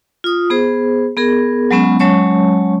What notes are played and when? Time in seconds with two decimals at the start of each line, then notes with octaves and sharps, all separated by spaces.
0.24 F4 D#6
0.50 B3 G#4 C5
1.17 B3 G#4 A#4
1.71 F#3 G#3 B3 C#4
1.99 F#3 G#3 C#4 C#5 A5 C#6